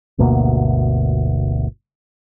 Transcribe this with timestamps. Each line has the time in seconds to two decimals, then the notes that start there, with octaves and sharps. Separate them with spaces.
0.18 G1 D2 B2 A#3